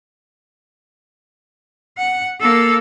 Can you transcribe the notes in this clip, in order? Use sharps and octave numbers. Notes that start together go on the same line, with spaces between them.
F#5
A#3 A4